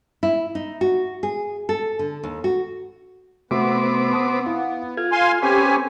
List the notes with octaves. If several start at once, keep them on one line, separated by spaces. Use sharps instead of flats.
E4
D#4
F#4
G#4
A4
D3
D#2
F#4
C3 A3 B3 C4 F#4 B4 D6
A5 B5 D#6
E4 F5 F#5
F4 A4 G#6
F5 G#5 C6
C4 C#4 G4 B4 G#5